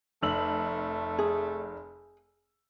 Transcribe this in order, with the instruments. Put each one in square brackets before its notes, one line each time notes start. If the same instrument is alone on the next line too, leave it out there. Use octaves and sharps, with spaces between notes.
[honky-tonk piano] F1 E6 F#7 [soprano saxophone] A3
[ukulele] G#4